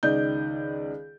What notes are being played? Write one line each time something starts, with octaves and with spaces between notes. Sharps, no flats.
C#2 D#3 D5 D#5 G6